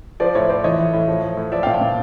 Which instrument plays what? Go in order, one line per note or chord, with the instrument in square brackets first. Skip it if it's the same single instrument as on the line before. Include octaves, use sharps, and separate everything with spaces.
[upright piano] F3 C5 D5
A2 C#5
A2 C5 D5
E3 C#5 D#5
A2
A2
F3
A2
A2
F3 D5 E5
A#2 F5 G5
G5 A5
A#2